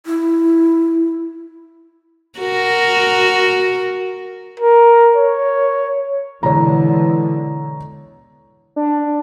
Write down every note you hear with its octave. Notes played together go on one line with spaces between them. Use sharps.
E4
F#4 A#4
A#4
C#5
B2 D3 E3 G#3 C#5 A#5
D4